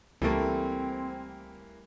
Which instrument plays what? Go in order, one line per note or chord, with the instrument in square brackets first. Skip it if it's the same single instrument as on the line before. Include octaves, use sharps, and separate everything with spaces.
[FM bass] C#2 [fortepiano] E3 A#3 [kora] G3 A3 D5 [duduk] C4